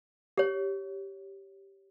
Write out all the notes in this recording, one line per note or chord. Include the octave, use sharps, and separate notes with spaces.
G4 C#5